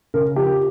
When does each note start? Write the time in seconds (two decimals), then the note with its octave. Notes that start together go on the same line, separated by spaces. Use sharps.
0.14 C#3 A#4
0.36 F3 G4